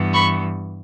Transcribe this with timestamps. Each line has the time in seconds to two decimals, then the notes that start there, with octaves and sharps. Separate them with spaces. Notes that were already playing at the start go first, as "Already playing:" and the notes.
Already playing: G2 E3 G3 B3
0.13 B5 C#6